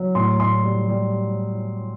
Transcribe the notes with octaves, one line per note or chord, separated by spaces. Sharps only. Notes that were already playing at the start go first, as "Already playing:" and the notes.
Already playing: F#3
A2 C6
A2 C6
G3
G3